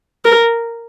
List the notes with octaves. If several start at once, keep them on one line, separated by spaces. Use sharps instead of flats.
A#4